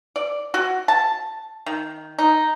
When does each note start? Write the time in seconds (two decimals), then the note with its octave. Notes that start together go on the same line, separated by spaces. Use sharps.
0.16 D5
0.54 F#4
0.88 A5
1.66 D#3
2.19 D#4